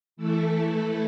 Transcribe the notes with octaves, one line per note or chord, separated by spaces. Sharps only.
E3 A3 E4 A4